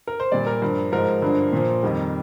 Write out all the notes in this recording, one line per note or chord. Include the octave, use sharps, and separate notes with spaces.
A#4
C5
A#2 G3 D5
A#4
G2 F3
G#2 F3 A#4
G2 D3 F3
A#2 F3
F2 D#3 G3